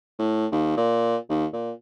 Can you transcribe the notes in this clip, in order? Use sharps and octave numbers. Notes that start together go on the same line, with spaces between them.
A2
D#2
A#2
D#2
A#2